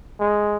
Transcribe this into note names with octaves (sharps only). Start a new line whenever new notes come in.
G#3